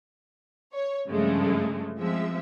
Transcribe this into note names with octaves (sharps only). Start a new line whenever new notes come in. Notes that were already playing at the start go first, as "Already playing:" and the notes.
C#5
G2 C#3 F3 G#3 A3
F3 G#3 C4 E5